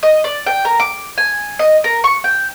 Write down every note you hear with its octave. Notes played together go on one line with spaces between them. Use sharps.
D#5
D5
G5
A#4
D6
G#5
D#5
A#4
C#6
G5